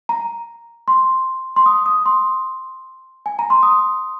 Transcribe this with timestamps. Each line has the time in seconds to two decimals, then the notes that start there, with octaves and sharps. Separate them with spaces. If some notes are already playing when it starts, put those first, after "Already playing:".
0.09 A#5
0.88 C6
1.56 C6
1.66 D#6
1.86 D#6
2.06 C6
3.26 G#5
3.39 A#5
3.50 C6
3.63 D#6